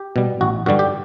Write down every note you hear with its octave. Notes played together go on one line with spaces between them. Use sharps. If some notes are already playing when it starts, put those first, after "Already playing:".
Already playing: G4
B2 G3
A1 F#4
G2 D3 G3 F#4
G4